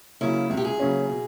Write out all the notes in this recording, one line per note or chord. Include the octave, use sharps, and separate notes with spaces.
C#3 F#3 A#3 C#4 E4
C#2 G#4
G4
G#4
C#3 F#3 A#3 C#4
B2